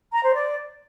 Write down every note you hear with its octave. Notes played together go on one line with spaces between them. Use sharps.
A#5
C5
D5